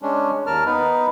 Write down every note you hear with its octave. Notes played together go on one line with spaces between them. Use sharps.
G#3 C#4 D4
D#2 A#4 A5 F6
B3 D#4 B4